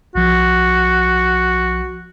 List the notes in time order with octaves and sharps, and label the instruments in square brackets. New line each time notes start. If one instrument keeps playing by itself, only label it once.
[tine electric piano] B1 F3 [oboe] F#4